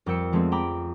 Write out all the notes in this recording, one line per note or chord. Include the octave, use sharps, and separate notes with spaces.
F2 G3 A#4 G5 E6 C#7
F3 G#3 A3 B3 C4
G5 A#5 B5 D6